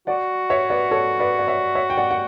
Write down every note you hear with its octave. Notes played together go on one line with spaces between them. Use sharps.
F#4 D5 F#5
C#5 E5
B4 D5
A4 C#5
B4 D5
D5
C#5 E5
C#5 E5
G5
D5 F#5
F#5